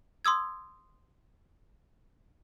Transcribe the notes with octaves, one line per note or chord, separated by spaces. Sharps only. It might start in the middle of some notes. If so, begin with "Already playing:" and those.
C6 D#6 E6 G#6